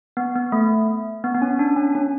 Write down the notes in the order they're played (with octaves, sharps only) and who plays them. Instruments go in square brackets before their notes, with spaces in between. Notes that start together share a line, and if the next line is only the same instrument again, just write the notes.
[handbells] B3
B3
A3
B3
B3
C#4
D4
C#4
C#4